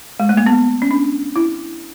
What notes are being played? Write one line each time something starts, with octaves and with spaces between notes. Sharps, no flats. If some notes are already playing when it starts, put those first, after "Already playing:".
G#3
A3
A#3
B3
C#4
D4
E4